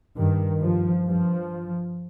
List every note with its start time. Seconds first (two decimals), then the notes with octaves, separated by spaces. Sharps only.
0.16 G2 D#3
0.62 G2 F3
1.06 G2 F3